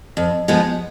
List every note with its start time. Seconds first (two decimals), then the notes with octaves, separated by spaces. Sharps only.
0.17 F2
0.48 F3 G#3 B3